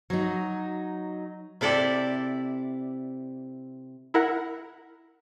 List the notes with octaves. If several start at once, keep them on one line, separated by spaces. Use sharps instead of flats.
F#3 D#4
C3 E4 A4 D5
E4 A#4 F#5